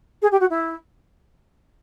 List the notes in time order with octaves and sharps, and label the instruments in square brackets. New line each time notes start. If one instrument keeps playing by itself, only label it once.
[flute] G#4
G4
F#4
E4